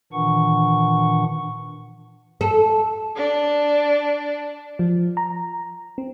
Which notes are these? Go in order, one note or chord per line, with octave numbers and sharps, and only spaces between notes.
A#2 D#3 E3 D4 F#5 C#6
A4
D4
F3
A#5
C4